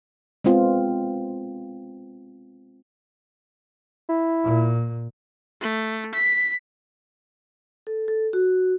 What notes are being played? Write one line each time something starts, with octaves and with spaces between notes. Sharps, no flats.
G#3 B3 C4 F4
E4
A#2
A3
B6
A4
A4
F#4